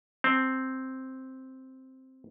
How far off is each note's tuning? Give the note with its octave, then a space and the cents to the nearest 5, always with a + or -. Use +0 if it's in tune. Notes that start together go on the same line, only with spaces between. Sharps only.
C4 +0 A5 +0